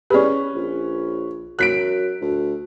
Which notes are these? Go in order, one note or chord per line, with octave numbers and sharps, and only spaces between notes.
C#4 G4 G#4 B4 D5
A#1
F#2 F#6 B6 D7
D2